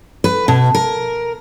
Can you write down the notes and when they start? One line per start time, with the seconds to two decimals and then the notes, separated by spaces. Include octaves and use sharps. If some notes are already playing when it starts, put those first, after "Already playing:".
0.24 B4
0.48 B2
0.75 A#4